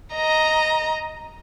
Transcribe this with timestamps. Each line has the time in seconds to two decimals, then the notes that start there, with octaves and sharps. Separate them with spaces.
0.15 D#5 A#5